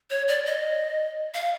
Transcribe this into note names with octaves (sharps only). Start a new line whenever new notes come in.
C#5
D5
D#5
F5